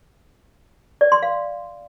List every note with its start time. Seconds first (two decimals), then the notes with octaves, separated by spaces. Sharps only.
1.01 D5
1.12 C6
1.23 F5